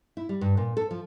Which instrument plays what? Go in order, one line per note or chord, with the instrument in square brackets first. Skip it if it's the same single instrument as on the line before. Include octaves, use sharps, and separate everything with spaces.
[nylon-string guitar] E4
G3
G2
A#2
A4
F3